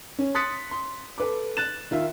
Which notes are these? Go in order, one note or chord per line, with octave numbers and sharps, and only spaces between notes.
C#4
C6 D#6 F#6 A6 B6 C#7
C6
A4 B4 D6
F#6 A6 E7
D#3 F4 E5